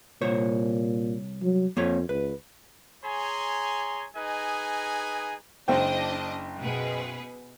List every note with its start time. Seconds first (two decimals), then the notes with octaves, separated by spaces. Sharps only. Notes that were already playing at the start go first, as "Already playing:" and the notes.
0.21 C2 A#2 C5 C#5
1.42 F#3
1.77 F2 A#3 C4 C#5
2.09 C#2 B4
3.05 G#4 C#5 G#5 A#5 C6
4.16 D#4 G#4 B4 D#5 G#5
5.68 F#1 D4 C5 D#5 G5
6.59 B2 G#4 B4